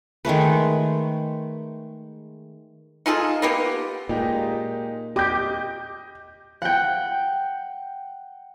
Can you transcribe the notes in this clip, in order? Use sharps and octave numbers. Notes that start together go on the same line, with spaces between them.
D#3 G#3 A3 B4
D#4 F4 G#4 A4
A#3 B3 G4
A#2 G#3 D#4 G4
G4 D#5 D6 G6
F#5 G5